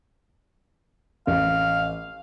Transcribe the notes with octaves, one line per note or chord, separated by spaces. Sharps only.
A1 F5